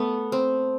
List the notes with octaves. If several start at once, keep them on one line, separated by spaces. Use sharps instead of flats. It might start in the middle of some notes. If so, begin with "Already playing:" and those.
Already playing: A3 B3
C4